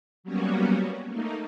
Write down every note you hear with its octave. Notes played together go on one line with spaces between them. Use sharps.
F#3 G3 A#3 B3 C#4 F#4
A3 A#3 D#4